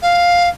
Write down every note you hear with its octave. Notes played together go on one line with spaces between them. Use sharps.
F5